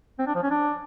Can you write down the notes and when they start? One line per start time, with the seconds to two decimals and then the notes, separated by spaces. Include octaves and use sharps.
0.19 C4
0.27 D4
0.35 F3
0.43 C#4
0.51 D4